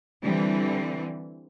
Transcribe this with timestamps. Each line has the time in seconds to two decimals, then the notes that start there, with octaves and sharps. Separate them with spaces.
0.22 D3 E3 G3 C4